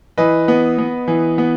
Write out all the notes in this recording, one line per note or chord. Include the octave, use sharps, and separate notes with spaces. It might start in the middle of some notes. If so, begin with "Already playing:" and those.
E3 B4 D#5
B3
B3
E3
B3